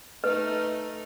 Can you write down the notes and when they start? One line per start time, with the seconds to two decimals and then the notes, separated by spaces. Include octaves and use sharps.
0.24 A3 D#4 B4